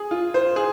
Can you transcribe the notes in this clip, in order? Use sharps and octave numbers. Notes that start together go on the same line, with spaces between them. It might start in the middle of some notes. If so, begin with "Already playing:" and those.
Already playing: G#4
F4
C5
G#4